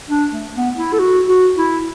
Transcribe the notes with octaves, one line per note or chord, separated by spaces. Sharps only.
D4
A3
B3
E4
A4
F#4
F#4
E4